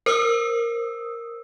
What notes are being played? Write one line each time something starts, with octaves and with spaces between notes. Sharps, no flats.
A#4 C5 D#6 E6